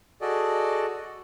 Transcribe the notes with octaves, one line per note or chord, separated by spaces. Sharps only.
F#4 G#4 A4 D5 D#5